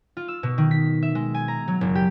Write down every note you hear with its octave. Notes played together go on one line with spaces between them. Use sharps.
F4
E6
B2
D#3
B6
E5
G#3
G#5
A#5
F#3
F#1
G4